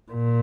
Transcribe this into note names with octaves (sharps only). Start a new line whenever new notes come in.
A#2